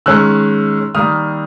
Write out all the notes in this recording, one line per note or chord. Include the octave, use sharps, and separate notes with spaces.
D#3 G#3 C#4 E6 F#6
D#3 G3 A#3 D#6 F6